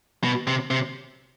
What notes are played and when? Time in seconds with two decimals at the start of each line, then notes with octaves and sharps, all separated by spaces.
0.24 B2
0.47 C3
0.71 C3